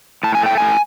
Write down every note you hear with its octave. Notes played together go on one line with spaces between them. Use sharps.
A2 A5
G#5
A3 G5
A2 G#5